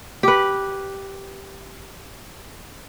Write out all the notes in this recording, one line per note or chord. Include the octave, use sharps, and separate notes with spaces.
G4 B4